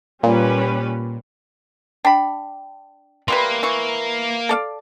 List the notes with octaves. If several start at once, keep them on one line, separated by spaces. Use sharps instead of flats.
A#2 G3 C#4 B4
D4 G5 B5
E3 G3 A#3 B4 C6
E3 C#6
A4 D5 F5